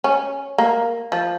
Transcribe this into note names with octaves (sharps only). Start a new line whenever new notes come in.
C#4
A#3
F3